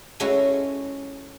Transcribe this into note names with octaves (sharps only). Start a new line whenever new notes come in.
G#3 A3 C#4 E4 F#4